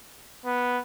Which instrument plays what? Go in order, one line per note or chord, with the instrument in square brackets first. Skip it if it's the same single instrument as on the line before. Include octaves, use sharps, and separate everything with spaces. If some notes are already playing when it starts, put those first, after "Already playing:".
[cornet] B3